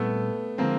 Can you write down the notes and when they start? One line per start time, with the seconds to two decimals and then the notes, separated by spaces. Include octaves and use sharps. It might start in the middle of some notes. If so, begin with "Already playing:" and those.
Already playing: A#2 G3 A3 B3 C4 E4
0.58 D3 F3 G#3 A#3 C4